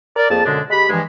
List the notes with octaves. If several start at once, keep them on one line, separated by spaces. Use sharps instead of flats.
A#4 D5
F2 A#3 G#4 A5
F#2 B2 D3 G#3 D4
G#3 G4 B5
G2 E3 F3 G#3